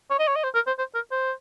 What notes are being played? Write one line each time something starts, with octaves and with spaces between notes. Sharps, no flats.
C#5
D#5
C#5
D#5
C5
A#4
C5
C5
A#4
C5